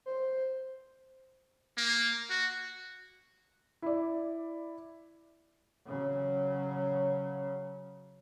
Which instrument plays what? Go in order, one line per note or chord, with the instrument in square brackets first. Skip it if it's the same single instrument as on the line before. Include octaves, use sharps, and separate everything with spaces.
[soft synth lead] C5
[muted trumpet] A#3
F#4
[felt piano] E4 D5
[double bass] C#3 F#3